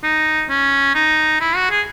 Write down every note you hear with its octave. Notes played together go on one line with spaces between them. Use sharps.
D#4
C#4
D#4
E4
F#4
G#4